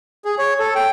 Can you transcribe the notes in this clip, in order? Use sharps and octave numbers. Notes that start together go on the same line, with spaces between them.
G#4
C#5
A4
G5